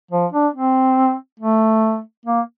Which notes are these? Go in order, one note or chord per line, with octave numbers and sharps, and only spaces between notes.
F3
D4
C4
A3
A#3